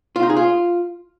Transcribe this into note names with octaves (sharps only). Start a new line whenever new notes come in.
F4
D#4
G#4
F4